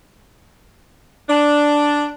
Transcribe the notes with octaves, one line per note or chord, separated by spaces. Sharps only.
D4